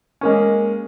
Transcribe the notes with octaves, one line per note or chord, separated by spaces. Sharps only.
G#3 A#3 C#4